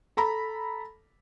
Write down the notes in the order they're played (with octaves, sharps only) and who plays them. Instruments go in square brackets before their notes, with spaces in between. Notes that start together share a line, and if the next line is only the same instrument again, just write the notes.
[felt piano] A4 A#5 B5